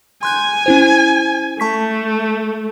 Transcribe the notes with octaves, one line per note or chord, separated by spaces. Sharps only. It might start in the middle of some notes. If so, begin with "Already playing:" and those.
G#5 C6 F#6 G6
C#4 E4 C5
A3 A5 C#6 B6